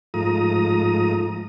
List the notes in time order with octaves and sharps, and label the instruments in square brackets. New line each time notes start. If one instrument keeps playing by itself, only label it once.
[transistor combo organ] G#2 F3 A3 A#5 D#6